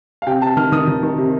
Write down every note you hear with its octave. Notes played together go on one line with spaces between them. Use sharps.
F5
C3 G5
C3 A5
D#3 F6
D#3 D#6
D#3
D#3
C3